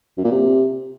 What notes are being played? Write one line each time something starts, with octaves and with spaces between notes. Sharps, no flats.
F#2
A#2
C3